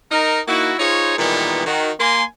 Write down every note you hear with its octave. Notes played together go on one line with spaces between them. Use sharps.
D#4 A#4
A#3 D#4 E4 F#4
D#4 F4 G#4 C5 C#5
A#2 D#3 E3 G3 G#3 B3
D#3 F#4
A#3 G#5 C6